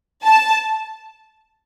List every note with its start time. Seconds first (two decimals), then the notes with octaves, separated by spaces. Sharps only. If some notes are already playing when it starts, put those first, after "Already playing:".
0.24 A5